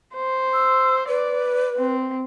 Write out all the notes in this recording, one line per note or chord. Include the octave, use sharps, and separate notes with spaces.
C5
E6
B4 D5
C4